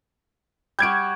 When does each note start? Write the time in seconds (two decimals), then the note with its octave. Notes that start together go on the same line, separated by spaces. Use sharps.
0.79 G3 F#4 G6 G#6 D7